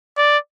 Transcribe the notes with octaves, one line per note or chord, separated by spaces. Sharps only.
D5